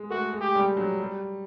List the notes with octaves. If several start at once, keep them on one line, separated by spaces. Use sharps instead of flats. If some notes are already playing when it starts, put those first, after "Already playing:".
Already playing: G#3
A3 F#4
G#3
G4
G3
F#3
G3